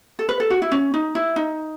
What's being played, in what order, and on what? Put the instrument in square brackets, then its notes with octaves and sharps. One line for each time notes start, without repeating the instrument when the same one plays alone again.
[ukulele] A4
B4
A4
F#4
E4
C#4
D#4
E4
D#4